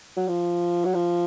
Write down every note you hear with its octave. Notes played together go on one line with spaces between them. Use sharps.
F#3
F3
F#3
F3